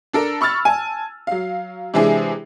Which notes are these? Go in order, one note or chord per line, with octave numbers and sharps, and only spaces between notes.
D4 A4 A#4
B5 C#6 E6 F6 A6
G#5 A5
F#3 F5
C3 E3 G#3 D4 E4 G#4